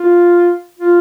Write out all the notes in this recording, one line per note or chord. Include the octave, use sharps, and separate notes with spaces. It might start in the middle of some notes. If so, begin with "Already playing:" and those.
Already playing: F4
F4